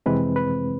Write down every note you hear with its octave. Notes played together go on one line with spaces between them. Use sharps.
F2 C3 E3 G#3 C4 B4
B4